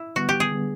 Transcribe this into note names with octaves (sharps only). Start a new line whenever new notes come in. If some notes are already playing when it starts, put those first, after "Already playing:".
Already playing: E4
D3 G3 B3 F#4
G4
G#4
D3 G3 B3